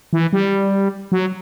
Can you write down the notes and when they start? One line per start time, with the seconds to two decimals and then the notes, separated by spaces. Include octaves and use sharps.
0.13 E3
0.33 G3
1.12 F#3